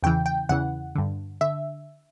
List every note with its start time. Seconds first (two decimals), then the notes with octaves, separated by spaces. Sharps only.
0.03 E2 C#3 E3 G5
0.26 G5
0.49 E2 C#3 E3 F#5
0.95 G2 D3
1.41 D3 E5